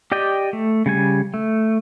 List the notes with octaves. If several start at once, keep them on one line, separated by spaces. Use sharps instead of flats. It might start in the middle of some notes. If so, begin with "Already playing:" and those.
G4 D5 D#5 G5
A3
C#3 G3 G#5
A3